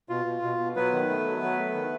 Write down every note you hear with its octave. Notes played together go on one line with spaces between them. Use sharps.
B2 F4
B2
B2
B2
F#3 B3 B4
D#3
A3
F#3
F#3
A3
D#3